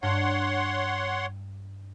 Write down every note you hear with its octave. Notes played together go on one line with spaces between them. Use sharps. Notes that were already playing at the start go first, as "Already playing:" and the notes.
G2 C#5 F#5 C6